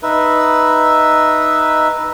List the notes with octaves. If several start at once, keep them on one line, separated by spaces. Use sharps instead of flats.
D#4 B4 E5